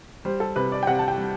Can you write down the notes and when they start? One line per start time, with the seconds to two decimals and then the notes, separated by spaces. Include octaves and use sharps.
0.25 G3 C5
0.40 A4
0.56 C3 B4
0.72 D5
0.83 G5
0.87 C3 F#5
0.99 A5
1.08 G5
1.18 G3